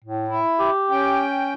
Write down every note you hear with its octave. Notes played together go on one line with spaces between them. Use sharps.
A2
E4
G4
C#4 G5